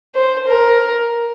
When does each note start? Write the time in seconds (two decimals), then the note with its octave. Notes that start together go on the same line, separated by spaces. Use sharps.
0.15 C5
0.47 A#4